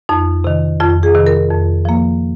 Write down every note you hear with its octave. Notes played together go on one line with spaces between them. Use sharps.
F2 D#4
C3 D#3
F2 F4
G#4
C3 D#3
A#4
F2
F3 A#3